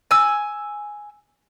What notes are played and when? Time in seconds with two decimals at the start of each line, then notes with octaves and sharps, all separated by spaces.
0.11 G#5 E6